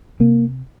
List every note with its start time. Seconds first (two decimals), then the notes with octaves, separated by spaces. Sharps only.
0.20 C3 A#3